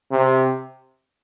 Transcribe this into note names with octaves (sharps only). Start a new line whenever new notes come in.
C3